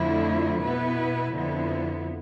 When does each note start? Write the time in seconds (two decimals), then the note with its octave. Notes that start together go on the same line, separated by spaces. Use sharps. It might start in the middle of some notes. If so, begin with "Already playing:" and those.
Already playing: F2 D3 F3 A3 E4
0.63 B2 B3 E4 B4
1.33 F2 D3 F3 B3 E4